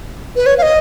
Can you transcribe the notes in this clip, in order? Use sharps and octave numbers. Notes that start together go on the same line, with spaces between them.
B4
C#5
F5
D#5